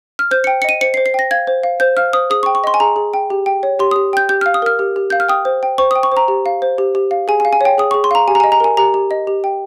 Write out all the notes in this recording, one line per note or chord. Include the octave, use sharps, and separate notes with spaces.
F6
C5 G6
G5 C#7
C#7
D#5 D#7
C5 C#7
C7
C5
C7
G5 A#6
F5 G#6
C5
F5
C5 G6
F5 F6
C5 D#6
G#4 D#6
C#6
G5
C#6
D#5 C6
G#5
G#4 A#5
G#4
G5
G4
G5
C#5
G4 C6
G4 D#6
G5 G6
G4 G6
F5 F6
D#6
A#4 F6
G4
G4
F5 G6
F6
G5 D#6
C5
G5
C5 C#6
G5 D#6
C#6
C5 A#5
G4
F5
C5
G4
G4
F5
G#4 G#5
G#5
F5
G#5
C#5 G5
G#4 D#6
G#4 C#6
C6
F5 A#5
G4 G#5
A#5
D#5 G#5
A#5
A#4 G#5
G4 A#5
G4
D#5
G4
G5